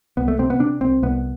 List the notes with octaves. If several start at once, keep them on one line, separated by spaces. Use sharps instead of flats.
C2 B3
A3
C3 C4
B3
C3 D4
C2 C4
C2 B3